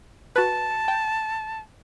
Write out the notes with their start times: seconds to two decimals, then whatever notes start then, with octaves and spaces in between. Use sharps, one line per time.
0.36 F#4 B4 A5
0.88 G5